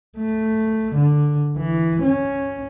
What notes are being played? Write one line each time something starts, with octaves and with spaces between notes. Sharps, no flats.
A3
D3
E3
C#4